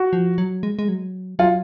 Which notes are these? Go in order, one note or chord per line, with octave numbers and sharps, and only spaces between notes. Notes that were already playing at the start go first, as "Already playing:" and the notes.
Already playing: F#4
F3
F#3
G#3
G#3
F#3
F#3 F4